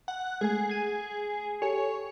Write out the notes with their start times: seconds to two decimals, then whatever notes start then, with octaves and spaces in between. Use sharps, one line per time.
0.08 F#5
0.41 G#3 A3 G#4 G#5
0.69 G#6 D#7
1.62 G4 A4 C#5 G#5